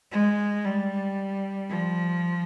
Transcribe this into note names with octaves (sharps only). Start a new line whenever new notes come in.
G#3
G3
F3